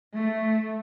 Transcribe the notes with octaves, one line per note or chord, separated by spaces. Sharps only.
A3